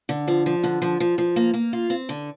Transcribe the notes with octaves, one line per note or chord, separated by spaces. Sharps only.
D3
F3
F3
D3
F3
F3
F3
A#3
A#3
F4
C4
D3